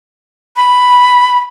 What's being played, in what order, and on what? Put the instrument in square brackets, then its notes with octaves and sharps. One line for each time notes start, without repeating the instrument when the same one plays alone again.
[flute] B5